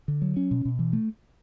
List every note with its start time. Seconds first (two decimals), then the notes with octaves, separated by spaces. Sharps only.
0.08 D3
0.22 F#3
0.37 C#4
0.51 B2
0.65 B2
0.79 E3
0.93 A3